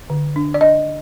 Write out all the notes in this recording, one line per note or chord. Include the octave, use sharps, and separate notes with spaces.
D3
D4
D5
D4 D#5